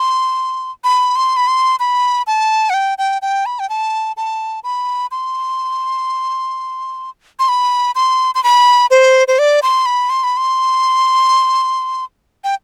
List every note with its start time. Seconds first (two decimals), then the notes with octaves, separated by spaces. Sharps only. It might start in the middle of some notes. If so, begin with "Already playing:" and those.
Already playing: C6
0.84 B5
1.16 C6
1.37 B5
1.47 C6
1.80 B5
2.27 A5
2.70 F#5
2.74 G5
2.98 G5
3.22 G5
3.46 B5
3.59 G5
3.69 A5
4.17 A5
4.64 B5
5.11 C6
7.39 C6
7.49 B5
7.95 C6
8.35 C6
8.44 B5
8.91 C5
9.28 C5
9.39 D5
9.63 C6
9.86 B5
10.10 C6
10.24 B5
10.37 C6
12.44 G5